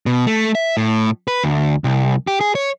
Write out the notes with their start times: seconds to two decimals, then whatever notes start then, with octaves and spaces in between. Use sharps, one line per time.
0.06 B2
0.27 A3
0.55 E5
0.77 A2
1.28 B4
1.44 D2
1.84 C2
2.27 G4
2.41 G#4
2.55 C#5